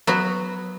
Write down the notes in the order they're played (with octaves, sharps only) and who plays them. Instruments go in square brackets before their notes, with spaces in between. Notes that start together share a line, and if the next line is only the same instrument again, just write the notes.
[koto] F#3 B3 F#4